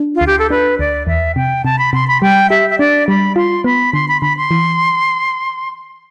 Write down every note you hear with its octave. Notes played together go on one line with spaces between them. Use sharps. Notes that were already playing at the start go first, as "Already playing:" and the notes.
Already playing: D4
F4
D2
G4
A4
D4 B4
D2 D5
E2 E5
C3 G5
C3 A5
B5
C3 C6
B5
G3 G5
G4 E5
E5
D4 D5
G3 B5
F4 C6
B3 B5
D3 C6
B5
D3 B5
C6
E3